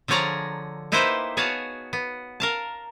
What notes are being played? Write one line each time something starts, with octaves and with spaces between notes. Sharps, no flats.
D3 F3 G#4 C#5 D5 A#5
A#3 D#4 E4 G4 B4 C5
B3 F#4 G#4 C#5 F5 A5
B3
A#4 F5 A5